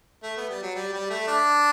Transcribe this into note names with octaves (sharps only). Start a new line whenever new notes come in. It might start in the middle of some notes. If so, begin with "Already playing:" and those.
A3
B3
G3
F#3
G3
G3
A3
D4